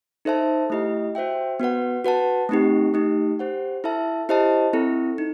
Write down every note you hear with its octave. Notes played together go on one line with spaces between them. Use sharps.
D#4 A4 C5 E5 A5
A3 E4 G4 D#5
F#4 C5 E5 G5
B3 F#4 B4 F#5
F#4 B4 F#5 A5
A3 C4 D#4 G4
A3 D#4 G4
G4 C5 F#5
E4 A4 E5 A5
E4 G4 C5 D#5 A5
C4 E4 A4
D#4